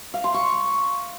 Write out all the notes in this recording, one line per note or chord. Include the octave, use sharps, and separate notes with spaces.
F5
C6
C#6